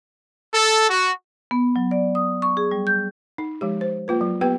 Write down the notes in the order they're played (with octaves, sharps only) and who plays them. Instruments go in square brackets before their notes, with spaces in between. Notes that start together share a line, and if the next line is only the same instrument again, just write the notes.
[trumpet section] A4
F#4
[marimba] B3
F#3
D5
D#6
C#6
G#4
G3
G6
[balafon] D#4
F3 G#3 G4
C5
A#3 F4 B4
F#3
B3 G4 B4 G5